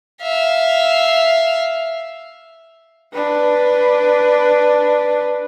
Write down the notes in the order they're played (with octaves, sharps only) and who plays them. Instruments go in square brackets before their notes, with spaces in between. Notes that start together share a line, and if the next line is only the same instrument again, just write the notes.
[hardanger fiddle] E5 F5
[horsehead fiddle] D4 B4